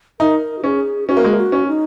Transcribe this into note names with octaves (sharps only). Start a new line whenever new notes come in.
D#4 A#4
F#4
C#4 G#4
C#4 F#4
A#3
G#3
A#3
F#4
C#4
D#4